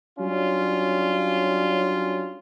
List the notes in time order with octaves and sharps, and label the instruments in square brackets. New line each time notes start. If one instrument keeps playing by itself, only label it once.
[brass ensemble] F#3 G3 C#4 D4 F4